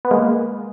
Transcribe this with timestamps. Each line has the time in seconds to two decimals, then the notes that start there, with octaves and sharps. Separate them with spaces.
0.05 B3
0.11 G#3 A#3